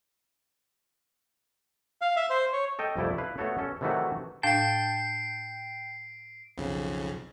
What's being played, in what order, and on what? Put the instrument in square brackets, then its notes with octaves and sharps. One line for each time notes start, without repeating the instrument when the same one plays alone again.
[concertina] F5
E5
C5
C#5
[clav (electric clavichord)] A4 D#5 G5
C2 F2 A3 E4 D5 A5
E4 B4 F5
A3 B3 F#4 A4 C#5
C#4 A4
C3 D#3 E3 F#3 A3 F#4
[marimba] A2 D4 F5 [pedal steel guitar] G5 A5 [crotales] C7 D7
[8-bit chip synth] B1 F2 C#3